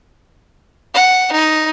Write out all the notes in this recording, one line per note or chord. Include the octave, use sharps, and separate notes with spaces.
F#5
D#4